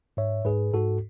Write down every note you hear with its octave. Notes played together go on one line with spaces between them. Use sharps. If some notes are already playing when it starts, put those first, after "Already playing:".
G#2 C#5 E5
G#2 G#4 B4
G#2 F#4 A4